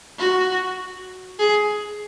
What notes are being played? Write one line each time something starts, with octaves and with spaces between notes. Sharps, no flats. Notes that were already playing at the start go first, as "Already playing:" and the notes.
F#4
G#4